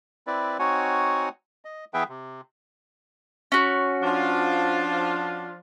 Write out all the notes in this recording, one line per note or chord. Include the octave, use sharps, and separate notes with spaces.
C4 E4 B4 D5
C4 D#4 F#4 C#5 F#5 G#5
D#5
E3 B3 G#4 B4 E5 G5
C3
C#4 F#4
F3 D4 F4